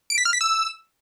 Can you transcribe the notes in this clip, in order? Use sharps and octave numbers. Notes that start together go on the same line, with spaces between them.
D7
B6
F6
B6
E6